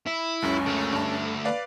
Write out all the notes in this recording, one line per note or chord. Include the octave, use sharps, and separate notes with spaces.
E4
C#2 F#2 C#3 C#4
D3 A3
G2 A5
B4 D5 F5